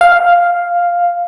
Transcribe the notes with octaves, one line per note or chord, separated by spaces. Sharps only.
F5